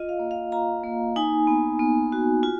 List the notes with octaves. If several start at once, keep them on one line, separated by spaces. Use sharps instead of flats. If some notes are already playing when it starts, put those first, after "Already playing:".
Already playing: F4 D#5
F5
A#3
F5
F4 A#5
A#3
D#4 G#5
B3
B3
F#4
F4